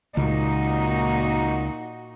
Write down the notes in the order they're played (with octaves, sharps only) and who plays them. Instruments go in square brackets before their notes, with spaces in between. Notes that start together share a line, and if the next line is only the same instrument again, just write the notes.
[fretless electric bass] C#2 [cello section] A#2 D#4 F#4